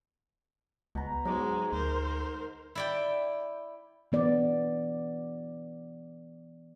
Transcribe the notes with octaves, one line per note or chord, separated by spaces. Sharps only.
C#2 B2 A#5
G#2 F#3 G#3 F#4 A#5 D6
D2 A#4 C5
E4 D5 G5
E3 B3 D5